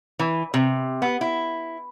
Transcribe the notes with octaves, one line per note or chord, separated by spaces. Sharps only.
E3
C3
B3
E4